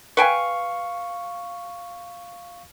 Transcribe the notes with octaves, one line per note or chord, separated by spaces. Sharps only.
B4 F5 G5 G#5 C#6